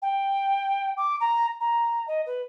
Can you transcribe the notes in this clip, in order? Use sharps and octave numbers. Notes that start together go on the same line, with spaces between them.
G5
D6
A#5
A#5
D#5
B4